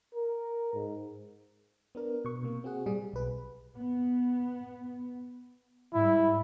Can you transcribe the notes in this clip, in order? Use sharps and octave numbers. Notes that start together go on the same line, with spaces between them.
A#4
G#2
B3 D4 A#4
B2 C#6
C3 A#3
C4 F#4 G#4 F#5
A#2 G3 G#4
B1 B4
B3
G#2 G3 E4